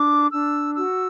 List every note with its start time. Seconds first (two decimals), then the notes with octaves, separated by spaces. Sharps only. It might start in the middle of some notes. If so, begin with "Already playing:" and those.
Already playing: D4 D6
0.30 D4 E6
0.75 F#4 E6